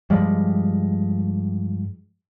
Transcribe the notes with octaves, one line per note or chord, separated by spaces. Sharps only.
G2 F3 G3 G#3